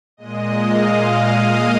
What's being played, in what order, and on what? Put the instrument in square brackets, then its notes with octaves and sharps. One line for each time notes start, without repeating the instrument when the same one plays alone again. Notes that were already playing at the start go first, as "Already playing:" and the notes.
[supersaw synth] A#2 G#3 D#5
F5
F5
D#5